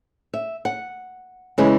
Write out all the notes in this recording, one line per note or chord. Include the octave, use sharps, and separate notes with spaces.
E5
F#5
C#3 E3 G#3